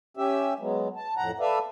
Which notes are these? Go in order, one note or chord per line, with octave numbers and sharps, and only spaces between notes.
C#4 G4 E5
F#3 G#3 B3
A5
F2 A2 F#5 A#5
A4 B4 D5 E5 F5